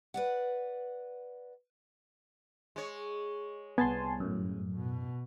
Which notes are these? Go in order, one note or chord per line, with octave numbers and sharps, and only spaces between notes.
B4 D5 F#5
G#3 C#5
C2 B3 G#5 A5 C6
G1 F#2 A2
B2